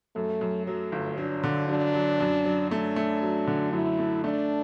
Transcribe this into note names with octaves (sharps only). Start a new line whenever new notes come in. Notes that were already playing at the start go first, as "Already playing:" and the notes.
F#2 A3
F#2
F#3 A3
G1
F#3 D4
D3
F#3 D4
F#3
F#2
F#3
A3 D4
A3
F#3
D3
F#2 E4
A3
A3 D4